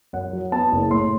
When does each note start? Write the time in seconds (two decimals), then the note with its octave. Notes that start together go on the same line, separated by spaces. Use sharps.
0.13 F#2 F#5
0.33 F#3
0.52 B3 A5
0.72 F#1
0.91 A2 C6